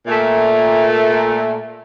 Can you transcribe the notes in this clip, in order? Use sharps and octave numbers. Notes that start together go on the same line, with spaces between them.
A#2 A3